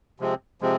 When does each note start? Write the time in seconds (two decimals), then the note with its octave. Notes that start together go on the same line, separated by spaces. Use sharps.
0.20 C3 F3 G#3 C4
0.61 C3 F3 G#3 C4